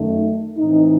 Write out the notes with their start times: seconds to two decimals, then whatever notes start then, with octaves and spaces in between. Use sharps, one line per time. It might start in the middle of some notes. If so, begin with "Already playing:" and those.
Already playing: F#2 D#3 A3 D#4
0.58 A2 E3 C4 D#4